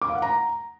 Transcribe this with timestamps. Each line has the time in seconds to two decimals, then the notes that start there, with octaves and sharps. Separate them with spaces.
0.02 D6
0.08 F5
0.15 F#5
0.22 A#5